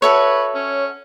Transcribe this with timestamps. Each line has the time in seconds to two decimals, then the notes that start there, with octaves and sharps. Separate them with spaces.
0.02 F#4 A4 B4 C#5 E5
0.55 C#4